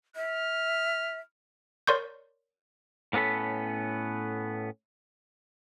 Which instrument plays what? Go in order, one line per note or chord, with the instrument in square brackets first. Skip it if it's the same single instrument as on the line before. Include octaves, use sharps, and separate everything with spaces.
[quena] E5 [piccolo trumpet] F6
[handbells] A#4 C#5 D5 C6 C#6 G6
[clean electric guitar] A2 A#3 B3 C#4 A4 B5